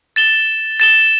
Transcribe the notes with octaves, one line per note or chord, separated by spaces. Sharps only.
A6 E7 G7
A6 E7 G7